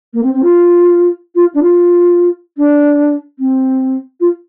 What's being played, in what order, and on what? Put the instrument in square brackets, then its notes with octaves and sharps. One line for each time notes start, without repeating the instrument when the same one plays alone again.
[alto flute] A#3
C4
C4
F4
F4
D4
F4
D4
C4
F4